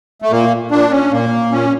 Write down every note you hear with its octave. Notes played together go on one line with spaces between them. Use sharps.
A3
A#2 A#3
A#2 D4
C#4
A#2 A#3
A#2 C#4